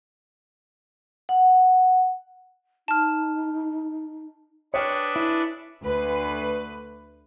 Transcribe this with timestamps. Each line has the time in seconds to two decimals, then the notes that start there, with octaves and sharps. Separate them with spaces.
1.29 F#5
2.88 D#4 A5 F6
4.74 D4 G#4 B4 C#5 G5 C#6 F6
5.16 E4
5.81 D2 B4